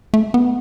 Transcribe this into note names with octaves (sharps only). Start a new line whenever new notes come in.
A3
B3